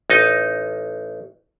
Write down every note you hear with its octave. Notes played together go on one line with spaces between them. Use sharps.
A1 D#4 D#5